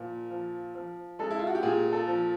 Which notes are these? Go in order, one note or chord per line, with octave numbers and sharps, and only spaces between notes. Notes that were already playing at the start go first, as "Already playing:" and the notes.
Already playing: A#2 F3
F3
F3
G#3 A4
E4
F4
F#4
G4
A#2 G#4
A4
F3